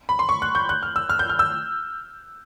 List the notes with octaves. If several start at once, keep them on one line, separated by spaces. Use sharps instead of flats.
B5
C6
C#6
F#6
G6
F#6
F6
E6
F6
G6
F6
E6